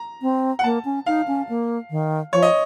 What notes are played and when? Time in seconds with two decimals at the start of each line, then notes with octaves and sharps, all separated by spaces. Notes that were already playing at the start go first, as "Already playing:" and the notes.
Already playing: A#5
0.22 C4
0.59 F#5
0.64 A#3 A5
0.85 C#4
1.06 D#4 F5
1.27 C#4
1.49 A#3
1.91 D#3
2.33 F3 C#5
2.42 D#5